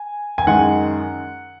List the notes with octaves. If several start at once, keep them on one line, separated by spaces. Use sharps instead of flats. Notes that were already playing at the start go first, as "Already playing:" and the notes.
Already playing: G#5
G#5
F#2 D#3 G#3 F#5